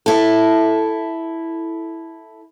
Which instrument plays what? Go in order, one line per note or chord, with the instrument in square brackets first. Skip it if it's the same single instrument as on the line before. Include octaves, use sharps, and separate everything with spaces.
[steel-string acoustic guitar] E4 A4